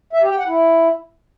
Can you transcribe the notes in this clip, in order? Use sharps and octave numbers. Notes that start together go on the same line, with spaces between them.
E5
G4
G5
F#5
E4